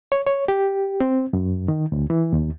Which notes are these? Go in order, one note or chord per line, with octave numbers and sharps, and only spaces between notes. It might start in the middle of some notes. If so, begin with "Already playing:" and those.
C#5
C#5
G4
C4
F#2
D#3
D2
E3
D#2